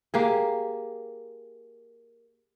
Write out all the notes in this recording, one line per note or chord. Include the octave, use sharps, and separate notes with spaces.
A#3 G4 G#4